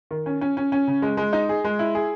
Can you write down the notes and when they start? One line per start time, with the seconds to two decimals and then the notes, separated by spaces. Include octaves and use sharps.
0.11 D#3
0.26 C#4
0.41 C#4
0.57 C#4
0.72 C#4
0.87 C#3
1.02 G#3
1.17 G#3
1.33 D#4
1.49 G#4
1.64 G#3
1.79 E4
1.95 G#4